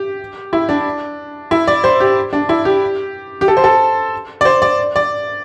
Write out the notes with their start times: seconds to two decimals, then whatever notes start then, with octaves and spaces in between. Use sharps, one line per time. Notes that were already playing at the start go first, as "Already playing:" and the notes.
Already playing: G4
0.53 E4
0.69 D4
1.51 E4
1.68 D5
1.84 C5
2.00 G4
2.33 D4
2.49 E4
2.65 G4
3.41 G4
3.48 A4
3.57 C5
3.64 A4
4.41 D5
4.45 C5
4.62 D5
4.96 D5